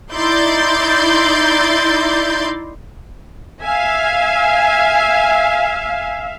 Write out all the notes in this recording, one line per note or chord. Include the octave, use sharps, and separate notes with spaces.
D#4 E4 D5 C6 G6 A6
E5 F5 G#5